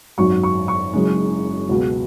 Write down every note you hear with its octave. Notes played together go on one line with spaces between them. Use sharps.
G#1 F#2 F#3 C#6
C#6
C#6
F#1 F#2 C#3 G#3
C#2 B2 F#3